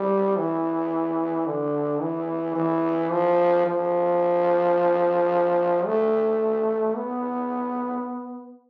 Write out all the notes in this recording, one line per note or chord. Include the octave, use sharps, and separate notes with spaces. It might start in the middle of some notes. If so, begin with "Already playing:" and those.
Already playing: G3
E3
D3
E3
E3
F3
F3
A3
B3